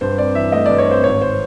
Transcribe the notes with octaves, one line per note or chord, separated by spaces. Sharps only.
G2 C5
C4 D5
E3 E5
A3 D#5
G2 D5
C#5
C4 C5
G#1 C#5
C5